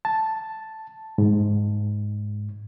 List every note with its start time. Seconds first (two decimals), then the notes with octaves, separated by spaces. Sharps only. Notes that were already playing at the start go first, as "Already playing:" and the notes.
0.05 A5
1.18 G#2